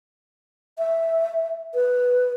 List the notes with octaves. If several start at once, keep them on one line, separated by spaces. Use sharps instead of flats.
E5
B4